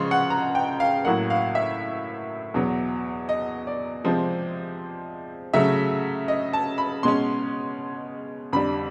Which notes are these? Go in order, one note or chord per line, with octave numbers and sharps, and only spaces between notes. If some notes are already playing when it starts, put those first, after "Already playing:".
Already playing: C#3 F3 G#3 C6 C#6
F#5
A#5
G5
F5
A2 F#3 A#3 F#5
F5
E5
E2 B2 F#3
D#5
D5
C3 F3 G#3 C4
C#3 F#3 A3 E5
D#5
A5
B5
B2 G#3 C#4 C6
F2 D3 G3 B5